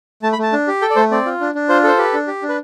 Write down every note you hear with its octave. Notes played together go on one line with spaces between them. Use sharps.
A3 A5
B5
A3 A5
D4
G4
A4 G5
D5
A3 C5
C4 D5
F4
D4
D4
F4 C5
A4 C5
G4 B4
D4
G4
D4
B4